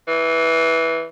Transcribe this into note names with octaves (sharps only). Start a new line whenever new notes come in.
E3